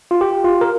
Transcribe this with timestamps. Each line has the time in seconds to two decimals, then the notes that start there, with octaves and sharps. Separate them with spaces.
0.11 F4
0.21 G4
0.44 F4
0.61 A#4